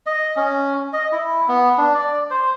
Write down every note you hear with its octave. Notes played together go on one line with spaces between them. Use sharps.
D#5
C#4
D#5
E4
B3
D4
D5
C5